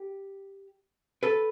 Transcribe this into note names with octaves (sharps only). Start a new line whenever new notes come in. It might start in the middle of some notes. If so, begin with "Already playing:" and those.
Already playing: G4
A4 B4